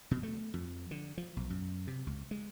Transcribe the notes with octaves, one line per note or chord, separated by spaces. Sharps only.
B2
A3
F2
D3
F3
B1
F#2
C3
C#2
G#3